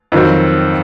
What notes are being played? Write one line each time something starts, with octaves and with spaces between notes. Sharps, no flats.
F2 D#3 F#3 C4